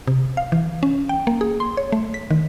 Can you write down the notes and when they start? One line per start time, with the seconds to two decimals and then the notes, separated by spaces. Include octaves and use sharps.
0.08 C3
0.37 F5
0.52 E3
0.83 C#4
1.09 G5
1.27 A#3
1.41 G#4
1.60 C6
1.77 C#5
1.92 A3
2.14 B6
2.31 D#3